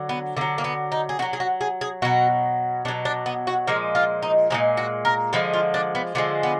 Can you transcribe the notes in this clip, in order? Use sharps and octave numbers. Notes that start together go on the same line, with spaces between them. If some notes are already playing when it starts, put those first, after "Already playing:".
Already playing: D3 F#3
B3
D3 F#3 A#3
A#3
B3
D#4
G#4
D3 F#4
F#3
G#4
F#4
G#4
G#4
B2 F#3 F#4
B2 F#3 D4
D4
B3
F#4
A#2 F3 G#3 A#4
F4
D#4
A#2 F3 G#3 D#4
F#4
A#4
D3 F3 G#3 B4
F4
D4
B3
D3 F3 G#3 B3
B3